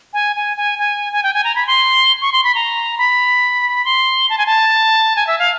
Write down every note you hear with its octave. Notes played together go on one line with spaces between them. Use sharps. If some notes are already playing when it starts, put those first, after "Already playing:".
G#5
G#5
G#5
G#5
G#5
G5
G#5
A#5
B5
C6
C#6
C6
B5
A#5
B5
C6
A5
G#5
A5
G#5
E5
F5